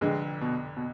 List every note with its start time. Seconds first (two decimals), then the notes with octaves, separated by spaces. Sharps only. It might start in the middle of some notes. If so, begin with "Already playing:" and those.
0.01 F1 F2 D3 G#3
0.41 B2
0.77 B2